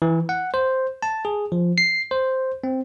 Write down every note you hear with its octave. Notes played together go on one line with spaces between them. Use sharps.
E3
F#5
C5
A5
G#4
F3
C7
C5
C4